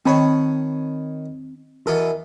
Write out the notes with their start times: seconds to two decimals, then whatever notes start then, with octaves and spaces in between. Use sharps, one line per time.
0.06 D#3 C4 C#5 A5 B5
1.87 B2 E3 A4 A#4